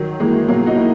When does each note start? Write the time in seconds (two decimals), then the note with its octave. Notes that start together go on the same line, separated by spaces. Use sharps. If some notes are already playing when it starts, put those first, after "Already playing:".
Already playing: D#3 F#3
0.20 E3 G#3 A#3 E4
0.48 B2 F#3 A#3
0.66 D#4 F#4
0.76 A#3 E4